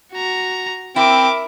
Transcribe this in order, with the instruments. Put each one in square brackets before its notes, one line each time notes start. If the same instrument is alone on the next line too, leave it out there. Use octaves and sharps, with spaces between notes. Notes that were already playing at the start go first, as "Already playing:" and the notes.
[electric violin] F#4 A#5
[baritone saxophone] C4 [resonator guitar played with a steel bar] E4 [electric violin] A#4 D6